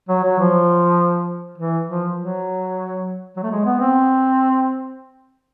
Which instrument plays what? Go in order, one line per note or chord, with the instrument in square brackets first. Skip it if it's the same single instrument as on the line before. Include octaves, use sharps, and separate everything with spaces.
[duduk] F#3
F#3
F3
E3
F3
F#3
F#3
A3
G#3
B3
C4